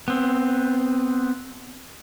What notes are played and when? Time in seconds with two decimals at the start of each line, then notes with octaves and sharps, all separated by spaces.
0.08 B3 C4